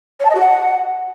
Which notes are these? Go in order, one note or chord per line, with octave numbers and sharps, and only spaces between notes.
C#5
A5
D#5
F#4
F#5